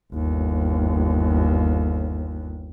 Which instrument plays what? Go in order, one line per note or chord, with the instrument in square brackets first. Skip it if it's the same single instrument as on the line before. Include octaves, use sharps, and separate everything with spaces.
[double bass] G1 D#2